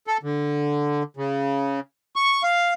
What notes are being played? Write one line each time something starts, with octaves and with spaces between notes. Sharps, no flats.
A4
D3
C#3
C#6
F5